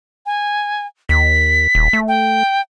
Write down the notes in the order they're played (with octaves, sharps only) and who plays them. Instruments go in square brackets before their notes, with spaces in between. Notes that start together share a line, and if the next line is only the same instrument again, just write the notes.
[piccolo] G#5
[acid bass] D#2 [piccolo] B6
[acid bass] D#1
A3
[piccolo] G5